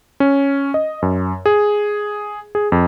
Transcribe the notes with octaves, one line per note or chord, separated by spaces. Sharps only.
C#4
D#5
F#2
G#4
G#4
F2